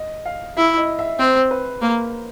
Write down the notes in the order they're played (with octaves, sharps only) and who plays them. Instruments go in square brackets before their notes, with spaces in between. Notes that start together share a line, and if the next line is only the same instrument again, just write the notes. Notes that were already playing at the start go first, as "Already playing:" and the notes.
Already playing: [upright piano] D#5
F5
[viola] E4 [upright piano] E5
[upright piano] D#5
E5
[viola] C4 [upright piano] C5
[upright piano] B4
[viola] A#3 [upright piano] A#4